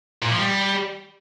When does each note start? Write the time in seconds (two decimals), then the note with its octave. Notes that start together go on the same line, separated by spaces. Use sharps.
0.22 A#2
0.31 F3
0.39 G3